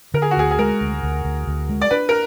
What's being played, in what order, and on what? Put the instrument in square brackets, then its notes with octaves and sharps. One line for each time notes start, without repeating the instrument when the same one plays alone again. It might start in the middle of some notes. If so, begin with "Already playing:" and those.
[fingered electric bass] D3 [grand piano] A#4
[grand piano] G#4
F#4
[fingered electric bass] D2 [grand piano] G#4
[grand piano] G#4
[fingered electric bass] G#3 [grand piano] A#4
[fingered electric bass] D2
D2
D2
D2
G#3
[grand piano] D5
[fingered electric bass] D4 [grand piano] B4
[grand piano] A#4